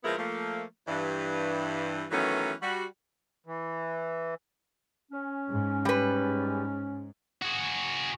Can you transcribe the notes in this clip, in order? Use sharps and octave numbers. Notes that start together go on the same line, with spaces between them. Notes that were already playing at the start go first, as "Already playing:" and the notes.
A#2 F3 G#3 B3 E4 A#4
F3 A3 A#3
G2 E3
D#3 E3 F#3 A3 B3 C#4
G3 F#4
E3
C#4
G#2
G3 B4
F#4 G#4